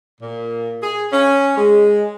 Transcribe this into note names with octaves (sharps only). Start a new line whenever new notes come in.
A#2
G#4
C#4
G#3